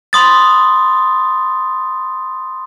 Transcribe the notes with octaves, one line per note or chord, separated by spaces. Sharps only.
B5 C6 D#6 A6